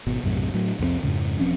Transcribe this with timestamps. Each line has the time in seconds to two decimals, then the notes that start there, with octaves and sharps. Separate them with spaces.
0.07 G#1 B2
0.23 B1 F#2 A2 C3
0.54 A2 F#3
0.79 C2 F2 G3 C4
1.03 F2 G#2 C#3
1.39 E1 F3 C4 C#4